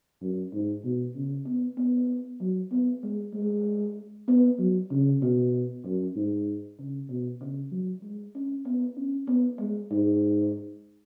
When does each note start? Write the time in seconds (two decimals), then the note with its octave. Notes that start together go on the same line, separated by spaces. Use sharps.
0.22 F#2
0.53 G#2
0.85 B2
1.16 C#3
1.47 B3
1.78 B3
2.41 F#3
2.72 B3
3.04 G#3
3.34 G#3
4.28 B3
4.59 F#3
4.91 C#3
5.22 B2
5.85 F#2
6.16 G#2
6.79 C#3
7.10 B2
7.41 C#3
7.72 F#3
8.03 G#3
8.35 C#4
8.66 B3
8.97 C#4
9.28 B3
9.60 G#3
9.91 G#2